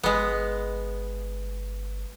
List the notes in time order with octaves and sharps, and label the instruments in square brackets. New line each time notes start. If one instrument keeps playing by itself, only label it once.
[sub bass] G1 [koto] G#3 B3